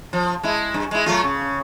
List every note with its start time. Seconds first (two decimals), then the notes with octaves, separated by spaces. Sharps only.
0.13 F3
0.43 G#3 E4
0.74 G2
0.91 G#3 E4
1.06 F#3 A3 F4
1.24 C#3